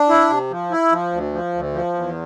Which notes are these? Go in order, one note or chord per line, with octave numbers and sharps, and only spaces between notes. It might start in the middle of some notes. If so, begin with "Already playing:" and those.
Already playing: D4
E4
C3
F3
E4
F3
D2
F3
D2
F3
E2